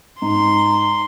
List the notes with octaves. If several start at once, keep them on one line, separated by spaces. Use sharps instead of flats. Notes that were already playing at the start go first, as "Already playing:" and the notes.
G#2 A#5 C6